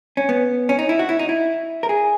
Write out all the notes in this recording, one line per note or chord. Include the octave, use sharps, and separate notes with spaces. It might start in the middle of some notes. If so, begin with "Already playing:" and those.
C#4
B3
C#4
D#4
E4
F#4
E4
D#4
E4
A#4
G#4